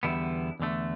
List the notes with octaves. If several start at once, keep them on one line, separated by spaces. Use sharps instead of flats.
E2 D3 G3 B3 E4
E2 D3 A3